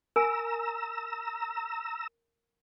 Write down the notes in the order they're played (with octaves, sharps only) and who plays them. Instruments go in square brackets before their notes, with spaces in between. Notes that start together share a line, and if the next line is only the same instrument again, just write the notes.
[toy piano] A#4 G#5 [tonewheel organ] A#5 E6